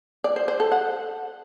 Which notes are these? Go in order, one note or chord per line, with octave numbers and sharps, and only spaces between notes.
D5
C5
C5
A4
F#5